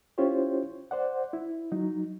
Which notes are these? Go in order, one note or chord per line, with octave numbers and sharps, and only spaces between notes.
C#4 E4 F4 G4 C5 C#5
C5 D5 F#5
E4
F#3 D#4